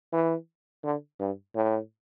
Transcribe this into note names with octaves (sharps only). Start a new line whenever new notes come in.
E3
D3
G2
A2